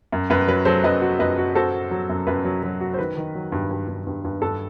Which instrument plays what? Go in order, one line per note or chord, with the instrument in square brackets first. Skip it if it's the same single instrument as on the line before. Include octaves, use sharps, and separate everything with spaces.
[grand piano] F#2
[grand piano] F#2 [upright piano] B4
[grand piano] F#3 [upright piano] B4
[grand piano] F#3 [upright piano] A4 C5
[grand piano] F#2 [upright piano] B4 D#5
[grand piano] F#4
[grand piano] F#2 [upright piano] B4 D#5
[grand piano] F#4
[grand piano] F#4 [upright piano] A4 C5
[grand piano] F#4
F#3
F#2
[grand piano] F#2 [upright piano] B4
[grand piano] F#3
F#3
F#4
[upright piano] C5
[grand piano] D#3 [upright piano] B4
[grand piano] D#3
F#3
G2
G2
G2
G2
G2
[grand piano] G2 [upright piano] A4